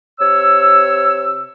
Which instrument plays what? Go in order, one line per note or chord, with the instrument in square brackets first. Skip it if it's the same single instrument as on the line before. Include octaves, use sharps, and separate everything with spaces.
[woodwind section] C3 C#5 E6